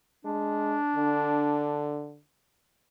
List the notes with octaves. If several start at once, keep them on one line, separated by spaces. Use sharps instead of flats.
G#3 D4
D3